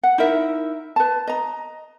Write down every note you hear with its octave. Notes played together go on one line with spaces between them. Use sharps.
F#5
D#4 E4 A#4 E5
B4 A5
D#5 A#5